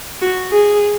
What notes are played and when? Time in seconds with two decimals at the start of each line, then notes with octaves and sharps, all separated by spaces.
0.22 F#4
0.52 G#4